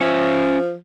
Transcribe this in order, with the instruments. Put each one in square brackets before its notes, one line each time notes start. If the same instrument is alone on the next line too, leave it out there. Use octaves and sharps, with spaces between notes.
[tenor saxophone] F3 [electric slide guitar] C#4 E5